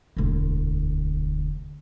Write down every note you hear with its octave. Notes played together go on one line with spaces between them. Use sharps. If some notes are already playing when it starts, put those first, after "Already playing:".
E1 D2